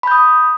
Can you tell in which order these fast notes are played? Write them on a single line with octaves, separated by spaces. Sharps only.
B5 G6 D#6